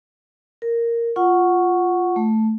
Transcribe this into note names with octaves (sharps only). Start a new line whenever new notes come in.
A#4
F4 F#5 C#6
A3